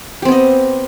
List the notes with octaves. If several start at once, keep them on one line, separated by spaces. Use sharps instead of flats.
B3 C4 G4 D#5